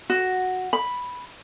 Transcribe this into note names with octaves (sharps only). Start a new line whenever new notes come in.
F#4
B5